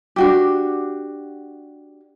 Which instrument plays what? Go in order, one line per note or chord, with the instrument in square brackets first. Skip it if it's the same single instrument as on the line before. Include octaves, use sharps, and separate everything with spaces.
[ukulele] D4 F#4 G4